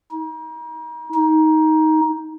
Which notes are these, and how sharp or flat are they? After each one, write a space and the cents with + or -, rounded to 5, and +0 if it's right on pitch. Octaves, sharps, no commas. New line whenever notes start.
D#4 +35
D#4 +15